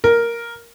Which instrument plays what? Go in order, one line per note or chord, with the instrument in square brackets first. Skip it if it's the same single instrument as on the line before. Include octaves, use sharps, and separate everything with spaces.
[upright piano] A#4